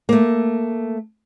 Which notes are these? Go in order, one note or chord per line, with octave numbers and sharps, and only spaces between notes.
A3 A#3